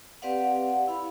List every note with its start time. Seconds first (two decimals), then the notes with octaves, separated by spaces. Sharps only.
0.22 C4 G4 B4 D5 F5 F#5
0.88 E4 F5 B5